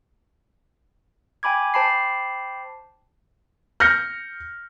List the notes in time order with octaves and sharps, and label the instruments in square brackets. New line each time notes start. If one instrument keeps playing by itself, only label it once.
[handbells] G5 G#5 B5 D6 G#6
C5 G5 A5 B5 D6 C7
[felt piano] F6 G6 A#6 C#7